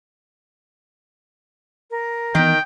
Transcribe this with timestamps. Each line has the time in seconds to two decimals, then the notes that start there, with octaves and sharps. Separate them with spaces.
1.91 A#4
2.35 D#3 E3 B3 G5